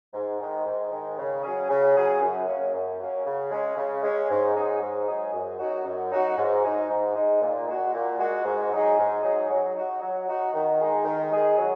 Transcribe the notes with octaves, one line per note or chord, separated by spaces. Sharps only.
G#2
D#3 G#3
G#2
D#3 G#3
C#3
F#3 C#4 G#4
C#3
F#3 C#4 G#4
F#2
F#3 A#3 C#4
F#2
F#3 A#3 C#4
C#3
G#3 C#4
C#3
G#3 C#4
G#2
F#3 D#4 G#4
G#2
F#3 D#4 G#4
F#2
F#3 D#4 F#4
F#2
F#3 D#4 F#4
G#2
G#3 D#4
G#2
G#3 D#4
A#2
G#3 F#4
A#2
G#3 F#4
G#2
F#3 D#4 G#4
G#2
F#3 D#4 G#4
F#3
D#4 F#4
F#3
D#4 F#4
D#3
G#3 D#4 G#4
D#3
G#3 D#4 G#4
F#3